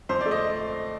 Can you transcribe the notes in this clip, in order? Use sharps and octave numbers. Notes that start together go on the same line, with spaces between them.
F2 C5
D5
A3
D#5